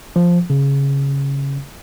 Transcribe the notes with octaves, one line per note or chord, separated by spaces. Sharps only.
F3
C#3